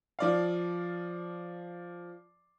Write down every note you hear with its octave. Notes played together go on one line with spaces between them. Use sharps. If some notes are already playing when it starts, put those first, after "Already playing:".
F3 D5 F5